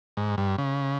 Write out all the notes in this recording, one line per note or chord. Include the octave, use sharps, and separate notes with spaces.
G#2
G2
C#3